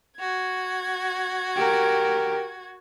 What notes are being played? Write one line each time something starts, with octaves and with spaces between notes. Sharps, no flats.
F#4 G#6
G4 A#4